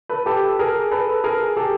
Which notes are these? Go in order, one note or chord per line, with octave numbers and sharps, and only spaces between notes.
A4 B4
G4 A4
G#4 A#4
A4 B4
G#4 A#4
G4 A4